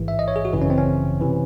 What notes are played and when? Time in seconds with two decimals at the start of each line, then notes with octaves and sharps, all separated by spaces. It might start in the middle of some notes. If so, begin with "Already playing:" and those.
Already playing: A1 G#2 E3
0.08 E5
0.19 D#5
0.28 C#5
0.36 G#4
0.45 F#4
0.53 G#1 F#2 C#3 E3
0.62 C#4
0.70 C4
0.78 C#4
1.21 C3 E3